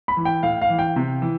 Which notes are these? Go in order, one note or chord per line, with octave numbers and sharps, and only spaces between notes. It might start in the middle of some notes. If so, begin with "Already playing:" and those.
B5
E3
G5
A2 F5
F5
E3
G5
C3
E3